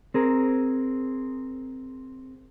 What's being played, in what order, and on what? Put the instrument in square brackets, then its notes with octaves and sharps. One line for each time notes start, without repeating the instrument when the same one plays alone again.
[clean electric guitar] C4 G#4 A#4